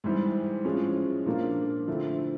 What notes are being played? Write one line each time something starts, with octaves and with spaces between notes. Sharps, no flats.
G#2 E3 G3 C4
A2 F3 G#3 C#4
A#2 F3 A#3 D4
D3 F3 A3 C4 E4